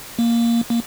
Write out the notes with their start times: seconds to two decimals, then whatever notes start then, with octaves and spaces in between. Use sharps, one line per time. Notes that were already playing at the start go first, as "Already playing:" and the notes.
0.19 A#3
0.70 A#3